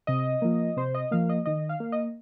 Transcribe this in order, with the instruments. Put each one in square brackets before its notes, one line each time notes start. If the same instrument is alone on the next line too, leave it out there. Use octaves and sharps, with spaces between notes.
[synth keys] C3 D#5
F3 A#3
C3 C5
D#5
F3 A#3 F5
D#5
D#3 D#5
F5
A#3
D#5